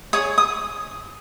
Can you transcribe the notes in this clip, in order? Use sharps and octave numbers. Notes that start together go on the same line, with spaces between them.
G#4 C#5 D#6
D#6